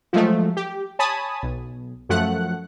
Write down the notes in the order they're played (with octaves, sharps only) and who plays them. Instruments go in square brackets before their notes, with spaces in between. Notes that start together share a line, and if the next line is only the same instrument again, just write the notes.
[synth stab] F3 F#3 G#3 A3
G4
C#5 G#5 A5 B5 D#6
B1
F#2 F3 A3 F#5 F#6